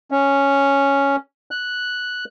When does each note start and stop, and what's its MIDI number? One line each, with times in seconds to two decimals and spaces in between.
0.11 1.16 61
1.51 2.25 90